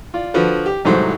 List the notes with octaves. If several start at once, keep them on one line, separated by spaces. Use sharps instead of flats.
F4 D5
D3 F3 F#4 A4 B4
G4
C2 G#2 E3 F#3 A3 C5